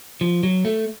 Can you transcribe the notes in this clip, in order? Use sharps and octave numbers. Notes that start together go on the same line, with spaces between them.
F3
F#3
A3